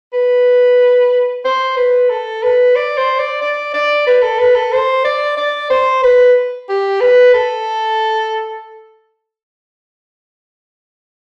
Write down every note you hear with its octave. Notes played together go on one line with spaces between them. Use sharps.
B4
C5
B4
A4
B4
D5
C5
D5
D5
D5
B4
A4
B4
A4
C5
D5
D5
C5
B4
G4
B4
A4